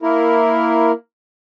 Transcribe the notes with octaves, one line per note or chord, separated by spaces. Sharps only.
A#3 E4 A#4